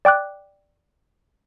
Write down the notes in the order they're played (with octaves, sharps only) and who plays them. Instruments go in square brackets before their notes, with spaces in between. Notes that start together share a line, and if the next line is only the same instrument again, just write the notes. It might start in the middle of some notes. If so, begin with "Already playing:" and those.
[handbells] D5 G5 D6 F#6